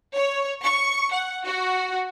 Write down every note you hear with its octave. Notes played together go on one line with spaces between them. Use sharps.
C#5
C#6
F#5
F#4